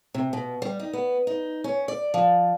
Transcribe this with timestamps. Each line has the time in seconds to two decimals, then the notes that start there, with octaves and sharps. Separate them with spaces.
0.14 C3
0.33 B2
0.62 G3
0.79 D#4
0.93 B3
1.27 D#4
1.64 C#4
1.88 D5
2.14 F3